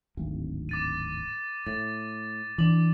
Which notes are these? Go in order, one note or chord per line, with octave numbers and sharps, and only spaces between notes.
D1 G#1
D6 A6 D#7
A2 A6
E3 C#4 D4 D6 F#7